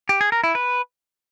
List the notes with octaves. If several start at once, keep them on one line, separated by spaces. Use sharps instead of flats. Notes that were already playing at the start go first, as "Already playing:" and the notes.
G4
G#4
A#4
E4
B4